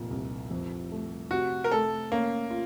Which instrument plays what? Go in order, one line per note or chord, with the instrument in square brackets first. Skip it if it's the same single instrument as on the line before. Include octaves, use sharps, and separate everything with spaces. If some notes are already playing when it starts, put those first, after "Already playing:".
Already playing: [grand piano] F1 A#2
C2
F2
A3
[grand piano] C3 [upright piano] F#4
[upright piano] A#4
[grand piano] A3 [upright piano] A4
[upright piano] A#3 [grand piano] C#4
[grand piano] F4